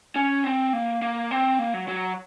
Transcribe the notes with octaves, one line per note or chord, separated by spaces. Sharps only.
C#4
C4
A#3
A#3
C4
A#3
F#3
F#3